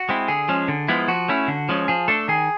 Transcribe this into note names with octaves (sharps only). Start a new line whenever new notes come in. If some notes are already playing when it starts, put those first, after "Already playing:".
Already playing: F#4
G#3 C4 E4
D3 G#4
F3 G#3 C#4
D3
F3 G#3 B3 E4
F3 F#4
A3 C#4 E4
D3
F3 G#3 C#4
F3 G#4
A3 D4 A4
D#3 G#4